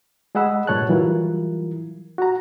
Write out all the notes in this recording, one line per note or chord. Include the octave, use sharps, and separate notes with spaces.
G#3 G#4 D#5 F#5 B5 E6
G2 A#2 C#5 A5 F#6
E3 F#3 G3 E4 F4 A#4
F#4 A#5